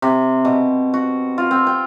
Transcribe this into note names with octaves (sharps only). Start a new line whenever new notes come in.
C3
B2
F#4
F4
C4
G5